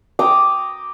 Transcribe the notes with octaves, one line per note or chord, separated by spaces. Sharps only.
G5 A#5 D6 D#6